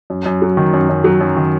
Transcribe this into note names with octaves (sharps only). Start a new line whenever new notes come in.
F#2
F#2
F#3
D#3
F#2
F#2
F#3
F#2
D#3